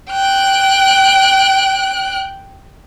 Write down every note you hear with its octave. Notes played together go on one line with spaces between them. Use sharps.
G5 F#6